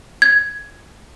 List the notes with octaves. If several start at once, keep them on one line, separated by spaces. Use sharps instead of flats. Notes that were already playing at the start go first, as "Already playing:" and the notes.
G#6